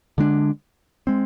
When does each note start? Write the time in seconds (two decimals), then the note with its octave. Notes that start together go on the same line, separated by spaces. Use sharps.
0.18 D3 G#3 D4
1.07 G#3 C4